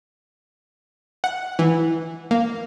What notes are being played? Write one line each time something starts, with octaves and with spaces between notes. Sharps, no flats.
F#5
E3
A#3